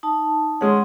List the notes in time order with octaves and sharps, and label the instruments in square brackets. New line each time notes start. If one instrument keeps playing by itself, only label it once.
[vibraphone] D#4 A5
[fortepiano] G#3 C#4 [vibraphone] F#5 C6